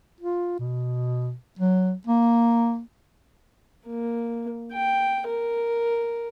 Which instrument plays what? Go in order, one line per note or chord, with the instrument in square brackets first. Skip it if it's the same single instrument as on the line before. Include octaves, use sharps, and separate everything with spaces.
[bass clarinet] F4
B2
F#3
A#3
[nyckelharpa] A#3
G5
A#4